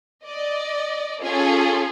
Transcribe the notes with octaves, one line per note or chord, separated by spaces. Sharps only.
D5 D#5
C#4 F4 G#4 A4